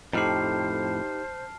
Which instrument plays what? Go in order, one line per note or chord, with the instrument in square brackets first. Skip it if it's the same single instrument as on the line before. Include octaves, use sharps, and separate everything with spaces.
[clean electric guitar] F2 A2 [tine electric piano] D#4 G4 [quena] C5 [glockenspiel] A5 F6 C7